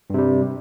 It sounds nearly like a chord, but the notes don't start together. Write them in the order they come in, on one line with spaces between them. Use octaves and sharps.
G2 C3 G3